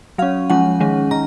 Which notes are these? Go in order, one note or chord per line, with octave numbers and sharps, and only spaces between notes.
F#3 C#4 F5
F3 G#3 C#4 F#5
D#3 G#3 C#4
D#3 A#5